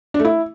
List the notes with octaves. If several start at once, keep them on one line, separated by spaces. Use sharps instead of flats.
D4
A3
E4